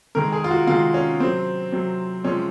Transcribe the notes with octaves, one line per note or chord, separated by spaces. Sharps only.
C3 D#3 G#3 A#4
G#4
F4
F#4
C3 D#3 G#3 F4
C#4
C3 F#3 C4
C3 F#3
C3 F3 G#3 C#4